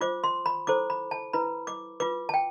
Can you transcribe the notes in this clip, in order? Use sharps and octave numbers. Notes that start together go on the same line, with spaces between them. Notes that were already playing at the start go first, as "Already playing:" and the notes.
F4 C5 D6
C6
B5
E4 A4 C5 D6
B5
A5
E4 B4 B5
D6
F4 B4 D6
A5
G5